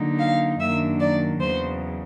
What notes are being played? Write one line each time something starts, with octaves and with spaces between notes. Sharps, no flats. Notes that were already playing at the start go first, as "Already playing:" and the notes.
Already playing: D3 F#3 A#3 D#4
F5
F#2 D#3 F#3 A#3 D4 E5
D5
E2 C#3 F#3 C5